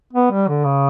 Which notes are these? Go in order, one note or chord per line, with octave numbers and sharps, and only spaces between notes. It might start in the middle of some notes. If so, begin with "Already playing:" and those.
B3
G3
D3
C#3